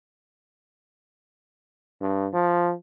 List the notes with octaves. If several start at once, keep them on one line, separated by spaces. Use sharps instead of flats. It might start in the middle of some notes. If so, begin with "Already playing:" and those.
G2
F3